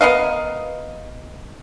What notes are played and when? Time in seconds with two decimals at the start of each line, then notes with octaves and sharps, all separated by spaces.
0.01 B3 A#4 D#5 F5